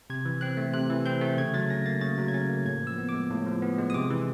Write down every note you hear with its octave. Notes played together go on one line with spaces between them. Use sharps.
C3 G#6
E3
C4 F#6
A3
C3 F#6
E3
C4 G6
A3
C#3 G#6
F#3 A6
C#4 A#6
A#3 A6
C#3 A6
F#3
G#6
C#4 A6
A#3
A2 G#6
F3
E6
B3
D6
G#3
A2
F3
B3
G#3
D#6
C3 D6
E3